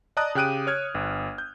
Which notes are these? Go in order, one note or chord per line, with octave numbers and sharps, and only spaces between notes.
D5 D#5 A5 A#5 D#6 F#6
C#3 G4 G5 F#6 D7 D#7
C#5 F6 G#6
G1
G6